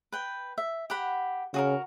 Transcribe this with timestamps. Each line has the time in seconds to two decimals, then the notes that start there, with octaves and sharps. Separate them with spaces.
0.12 B4 G5
0.58 E5
0.90 G4 F#5 B5
1.54 C#3 F#4 G#4 A#4